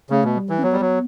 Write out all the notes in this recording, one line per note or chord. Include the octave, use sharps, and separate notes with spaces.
C#3 A3
B2
G3
E3
C#4
F#3 B3
G3
F#3